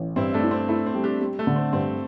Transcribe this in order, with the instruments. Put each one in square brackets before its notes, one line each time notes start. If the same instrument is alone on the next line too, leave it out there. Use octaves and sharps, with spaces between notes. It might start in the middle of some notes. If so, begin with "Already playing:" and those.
Already playing: [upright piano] A1
[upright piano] G2 [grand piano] C4 E4
[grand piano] A3 D4
[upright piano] E4
[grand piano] C4
[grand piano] A3 [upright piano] E4
[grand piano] C4
[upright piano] G3
[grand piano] D4 G4
[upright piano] G3
[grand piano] A3
[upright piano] D3
[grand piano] C4
[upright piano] G2 [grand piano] C4